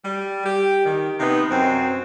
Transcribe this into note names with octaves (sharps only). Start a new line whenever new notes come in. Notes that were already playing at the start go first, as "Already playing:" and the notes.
G3
G4
D#3
C3 B3 D#4
F#2 C4